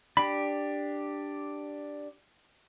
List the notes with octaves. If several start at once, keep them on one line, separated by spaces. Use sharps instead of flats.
D4 G4 B5